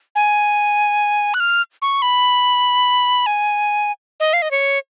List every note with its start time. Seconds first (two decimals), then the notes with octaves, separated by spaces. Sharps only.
0.15 G#5
1.34 F#6
1.40 F6
1.82 C#6
2.02 B5
3.26 G#5
4.20 D#5
4.33 F5
4.42 D#5
4.51 C#5